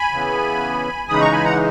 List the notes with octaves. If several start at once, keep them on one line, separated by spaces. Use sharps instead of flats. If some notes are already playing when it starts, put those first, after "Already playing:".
Already playing: G#5 B5
C#3 E3 B3
C#3 E3 G#3 D#4 B5 D#6
A#5 C#6
G#5 B5
F#5 A#5